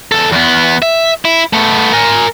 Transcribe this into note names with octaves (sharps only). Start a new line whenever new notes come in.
E2 A4
E2 B3
E5
E4
A3 B3
A#4 G#5